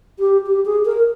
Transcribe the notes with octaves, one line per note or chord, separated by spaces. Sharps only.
G4
G4
G#4
A#4